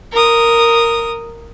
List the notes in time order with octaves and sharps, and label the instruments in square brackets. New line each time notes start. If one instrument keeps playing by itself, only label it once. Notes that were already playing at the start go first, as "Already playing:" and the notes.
[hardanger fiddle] A#4 D#6